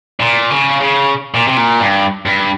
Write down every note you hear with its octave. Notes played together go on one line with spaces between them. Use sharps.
A#2
C#3
C#3
A#2
C3
A#2
G2
G2